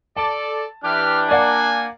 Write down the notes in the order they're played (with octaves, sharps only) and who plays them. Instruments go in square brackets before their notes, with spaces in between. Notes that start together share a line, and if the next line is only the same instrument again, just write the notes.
[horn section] A4 D5 [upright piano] A5
[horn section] E3 G4 [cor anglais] D4 [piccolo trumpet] F6
[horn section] A#3 [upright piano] A#4 D5 F#5 [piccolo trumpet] G#5